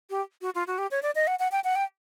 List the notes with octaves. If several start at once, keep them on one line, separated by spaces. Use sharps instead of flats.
G4
F#4
F4
F#4
G4
C#5
D5
D#5
F#5
F#5
G5
F#5
G5